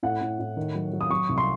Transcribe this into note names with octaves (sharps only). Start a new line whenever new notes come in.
A2 F#5
A2
A2
D#3
F#3
F#3
D#6
F#3 C#6
C2
C6